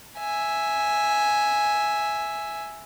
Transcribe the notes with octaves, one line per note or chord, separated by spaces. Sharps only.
E5 G#5